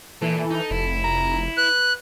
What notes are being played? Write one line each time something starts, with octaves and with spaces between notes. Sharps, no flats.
A#2 E3 A4
D#4
F1 E4
A#5
B4 F#6